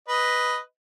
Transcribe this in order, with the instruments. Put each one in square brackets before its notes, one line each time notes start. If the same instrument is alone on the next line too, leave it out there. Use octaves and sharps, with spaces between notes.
[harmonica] B4 D#5